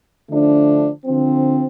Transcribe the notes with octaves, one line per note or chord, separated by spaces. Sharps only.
D3 F3 A3 D4
D3 F3 C4